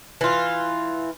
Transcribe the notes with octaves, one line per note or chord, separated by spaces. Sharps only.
E3 F4